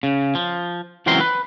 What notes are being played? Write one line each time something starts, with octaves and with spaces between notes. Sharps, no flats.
C#3
F3
C#2 E3 F#3 C4 A#4 C6
B4